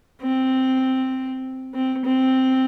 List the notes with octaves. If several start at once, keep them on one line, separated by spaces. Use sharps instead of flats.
C4
C4
C4